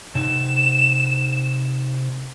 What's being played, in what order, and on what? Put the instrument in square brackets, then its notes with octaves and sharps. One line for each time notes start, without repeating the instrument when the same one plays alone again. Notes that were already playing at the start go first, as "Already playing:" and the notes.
[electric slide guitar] C3 D#4 [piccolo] E7